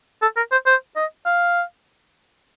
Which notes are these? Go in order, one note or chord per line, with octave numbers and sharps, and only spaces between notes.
A4
A#4
C5
C5
D#5
F5